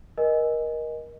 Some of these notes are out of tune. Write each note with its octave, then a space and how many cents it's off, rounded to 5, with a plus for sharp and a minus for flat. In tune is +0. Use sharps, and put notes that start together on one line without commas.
A#4 +25 D#5 +0 G#5 +0